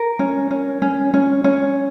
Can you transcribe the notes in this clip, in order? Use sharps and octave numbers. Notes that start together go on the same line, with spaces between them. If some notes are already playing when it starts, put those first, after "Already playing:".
Already playing: A#4
C#4
C#4
C#4
C#4
C#4